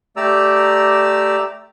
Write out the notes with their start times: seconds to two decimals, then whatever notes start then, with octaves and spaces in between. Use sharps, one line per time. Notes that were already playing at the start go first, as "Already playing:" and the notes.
0.16 A3 G4 D5 A#5 E6